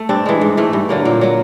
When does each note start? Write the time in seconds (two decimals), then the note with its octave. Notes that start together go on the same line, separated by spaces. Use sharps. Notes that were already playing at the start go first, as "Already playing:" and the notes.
Already playing: A3
0.09 G2 C4 D4
0.26 E3 G#3
0.41 G#2
0.57 E3 A3
0.73 G2
0.89 D3 F#3 A#3
1.05 A#2 A#3
1.21 F#3 A#3